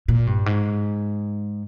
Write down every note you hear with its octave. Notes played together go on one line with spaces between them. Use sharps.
A#2
G2
G#2